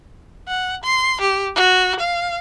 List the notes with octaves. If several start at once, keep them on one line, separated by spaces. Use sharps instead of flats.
F#5
C6
G4
F#4
F5